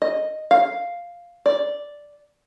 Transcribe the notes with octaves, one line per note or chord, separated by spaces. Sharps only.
D#5
F5
D5